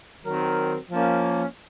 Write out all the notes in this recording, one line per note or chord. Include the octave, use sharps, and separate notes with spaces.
D#3 F#3 C4 F#4 A#4
F3 A#3 C#4